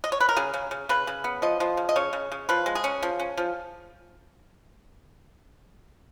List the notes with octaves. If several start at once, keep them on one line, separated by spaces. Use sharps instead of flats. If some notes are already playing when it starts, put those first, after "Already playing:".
D#5
C#5
B4
A#4
C#3 G#4
C#3
C#3
C#3 B4
C#3
B3
F3 D#5
F3
C#3
D#5
C#3 C#5
C#3
C#3
F3 B4
G#3
G#4
C#4
F3
C#4
F3